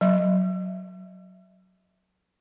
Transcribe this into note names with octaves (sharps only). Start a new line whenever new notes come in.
F#3 E5